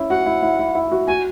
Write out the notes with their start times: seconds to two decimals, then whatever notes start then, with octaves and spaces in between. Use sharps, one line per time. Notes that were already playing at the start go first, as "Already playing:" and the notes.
Already playing: C#4 E4
0.10 F#4 F#5
0.26 E4
0.43 E4
0.59 E4
0.75 E4
0.92 F#4
1.07 F#4 G#5